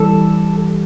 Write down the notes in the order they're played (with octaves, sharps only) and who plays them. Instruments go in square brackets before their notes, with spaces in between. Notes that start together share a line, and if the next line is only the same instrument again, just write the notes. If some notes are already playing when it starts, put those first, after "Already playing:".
Already playing: [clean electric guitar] E3 G3 A4